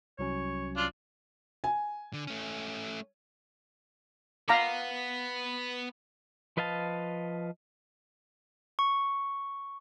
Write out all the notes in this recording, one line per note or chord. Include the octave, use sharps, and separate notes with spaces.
C2 F#3 C#4 C#5
D4 F4
G#5
D3
A3 C#4
B3 F5 A#5 D6
F3 B4 D#5 F5 A5
C#6